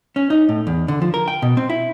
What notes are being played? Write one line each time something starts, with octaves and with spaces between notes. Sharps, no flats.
C#4
D#4
A2
E2
D3
F3
A#4
G5
B2
C4
E4